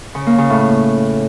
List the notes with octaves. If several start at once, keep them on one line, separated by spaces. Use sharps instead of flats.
C#3
A#3
C#3
A2